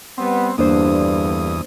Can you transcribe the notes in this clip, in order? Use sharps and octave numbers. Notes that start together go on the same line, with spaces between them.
G3 B3 C4
E2 G2 D3 A#3 D4 C5 D#6